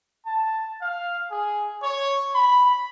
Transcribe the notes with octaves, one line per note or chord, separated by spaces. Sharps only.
A5
F5
G#4
C#5
B5